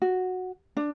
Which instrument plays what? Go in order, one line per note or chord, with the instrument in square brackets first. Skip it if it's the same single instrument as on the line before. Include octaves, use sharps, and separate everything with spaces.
[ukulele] F#4
D4